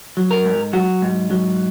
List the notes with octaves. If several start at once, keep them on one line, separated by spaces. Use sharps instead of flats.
F#3
A#4
G#2
F#3 F#4
G#2
F#3